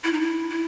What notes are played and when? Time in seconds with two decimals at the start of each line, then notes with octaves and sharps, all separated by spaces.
0.04 E4
0.13 D#4
0.21 E4
0.50 E4